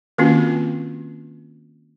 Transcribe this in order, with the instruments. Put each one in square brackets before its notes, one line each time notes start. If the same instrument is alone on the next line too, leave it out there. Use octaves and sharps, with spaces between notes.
[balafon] D#3 A#3 C4 C#4 F4 F#4